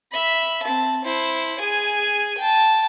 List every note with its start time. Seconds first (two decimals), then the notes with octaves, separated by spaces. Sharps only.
0.12 E5 B5
0.63 C4 A5
1.04 E4 C5
1.59 G#4 G#5
2.38 G5 A5